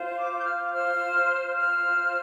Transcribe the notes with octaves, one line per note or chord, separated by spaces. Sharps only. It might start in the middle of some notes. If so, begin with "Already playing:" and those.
Already playing: F4 C5
D6
F4
G6
F6
D6
C5 F6
F4
C5 F6
F4